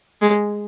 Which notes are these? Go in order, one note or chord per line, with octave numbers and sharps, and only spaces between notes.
G#3